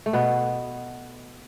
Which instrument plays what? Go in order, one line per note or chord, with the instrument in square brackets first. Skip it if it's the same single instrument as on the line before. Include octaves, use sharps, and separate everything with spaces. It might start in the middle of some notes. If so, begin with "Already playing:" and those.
[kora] A3
B2 B3